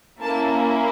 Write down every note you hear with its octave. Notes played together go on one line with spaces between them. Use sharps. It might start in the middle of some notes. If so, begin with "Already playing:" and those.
A#3 C#4 E4 A5